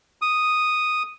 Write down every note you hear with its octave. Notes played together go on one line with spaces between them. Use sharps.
D#6